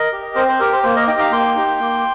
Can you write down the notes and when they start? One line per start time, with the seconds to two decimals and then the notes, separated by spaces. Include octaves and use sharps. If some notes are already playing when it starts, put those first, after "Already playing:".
Already playing: A#4 D#5
0.12 G4
0.35 C4 C5
0.48 C5
0.60 G4 A#4
0.72 C5
0.83 A#3 C5
0.96 A#4 D#5
1.07 D#4 G4 D#5 G5
1.19 F5 A#5
1.32 A#3 G5 C6
1.56 D#4 G4
1.80 A#3